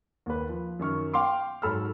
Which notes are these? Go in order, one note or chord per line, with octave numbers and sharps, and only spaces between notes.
D#2 B4
F3
F#2 D#3 C#6 F6
F5 G5 C6 D6
G#2 F#3 A4 B5 E6 F6